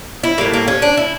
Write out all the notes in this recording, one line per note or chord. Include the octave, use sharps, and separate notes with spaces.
E4
A2 G3 A#3
A#3
C#4
D4
E4